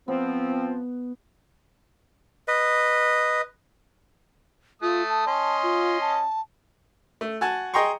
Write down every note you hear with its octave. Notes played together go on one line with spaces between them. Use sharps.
F3 B3 C4
B4 D#5
A3 F4 D#6
A5
C#4 D#5 C6
F4
A5
A3
F#4 G#5 A5
G#4 D#5 G5 A#5 C6 C#6